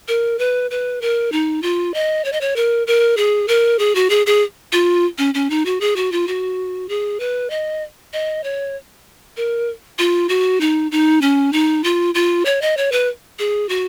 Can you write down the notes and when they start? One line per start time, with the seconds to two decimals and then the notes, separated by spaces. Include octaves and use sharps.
0.08 A#4
0.39 B4
0.71 B4
1.01 A#4
1.32 D#4
1.63 F4
1.94 D#5
2.25 C#5
2.33 D#5
2.41 C#5
2.56 A#4
2.87 A#4
3.17 G#4
3.48 A#4
3.79 G#4
3.95 F#4
4.10 G#4
4.26 G#4
4.72 F4
5.18 C#4
5.34 C#4
5.50 D#4
5.65 F#4
5.81 G#4
5.96 F#4
6.12 F4
6.28 F#4
6.89 G#4
7.20 B4
7.50 D#5
8.13 D#5
8.44 C#5
9.37 A#4
9.99 F4
10.29 F#4
10.61 D#4
10.92 D#4
11.22 C#4
11.53 D#4
11.84 F4
12.15 F4
12.45 C#5
12.62 D#5
12.77 C#5
12.92 B4
13.39 G#4
13.69 F#4